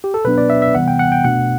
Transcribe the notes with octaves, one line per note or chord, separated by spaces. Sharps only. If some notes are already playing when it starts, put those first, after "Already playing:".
G4
A4
B2 F#3 B3 D4 B4
D5
E5
E5
C3 E3 G3 B3 F#5
G5
F#5
G5
B2 A3 D4 F#5